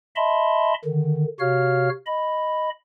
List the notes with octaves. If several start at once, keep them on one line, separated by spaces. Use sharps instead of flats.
D#5 E5 A5 B5 C6
D3 D#3
C3 F#4 C#5 F5 F6
D#5 B5